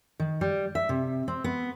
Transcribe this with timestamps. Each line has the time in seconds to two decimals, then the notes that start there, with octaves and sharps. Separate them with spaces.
0.20 D#3
0.41 G3
0.75 E5
0.89 C3
1.28 C4
1.44 B3